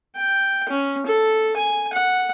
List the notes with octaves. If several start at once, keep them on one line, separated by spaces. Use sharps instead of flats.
G5
C#4
A4
G#5
F#5